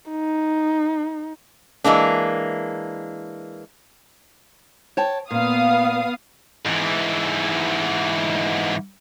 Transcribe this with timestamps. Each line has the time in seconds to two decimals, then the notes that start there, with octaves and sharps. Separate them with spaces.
0.11 D#4
1.84 E3 G#3 A#3 D4
4.97 C#5 G5 A5
5.31 A#2 B3 F5 D#6
6.66 G#2 E3